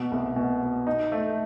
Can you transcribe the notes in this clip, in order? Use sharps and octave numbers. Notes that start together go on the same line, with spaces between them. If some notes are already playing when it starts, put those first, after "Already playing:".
Already playing: B2
C2
B2
B2
D#4
A3